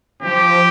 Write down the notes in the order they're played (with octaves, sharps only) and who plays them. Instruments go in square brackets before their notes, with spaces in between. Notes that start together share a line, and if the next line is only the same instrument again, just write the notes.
[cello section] F3 [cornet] G4